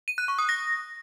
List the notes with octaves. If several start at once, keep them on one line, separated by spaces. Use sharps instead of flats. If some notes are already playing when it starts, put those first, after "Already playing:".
D#7
F#6
C#6
D#6
A#6